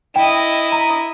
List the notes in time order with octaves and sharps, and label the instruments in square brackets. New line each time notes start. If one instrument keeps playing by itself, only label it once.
[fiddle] E4 D#5 [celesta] G5
[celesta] A#5